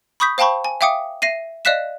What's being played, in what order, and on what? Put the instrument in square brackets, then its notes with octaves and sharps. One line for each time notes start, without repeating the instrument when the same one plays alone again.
[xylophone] B5 C#6 D#6 G6 B6
C5 F5 G5 A5 B5 C#6
G#5
E5 F5 G5 D6 D#6 C#7
E5 A#6 C7 D#7
D5 D#5 F5 F#6 B6 E7